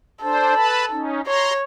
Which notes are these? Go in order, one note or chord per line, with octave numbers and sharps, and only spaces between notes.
D4 A4 C5
B4 A5 B5
C#4 D#4
C#5 A#5 C6